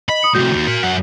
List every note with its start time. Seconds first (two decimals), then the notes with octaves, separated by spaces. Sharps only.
0.09 D#5 B5
0.23 D#6 C#7
0.34 A2 C3 F#4 G6
0.53 D#2
0.68 A#4 C6
0.83 F#2 F#5